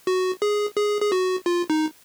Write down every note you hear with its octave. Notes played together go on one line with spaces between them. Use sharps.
F#4
G#4
G#4
G#4
F#4
F4
D#4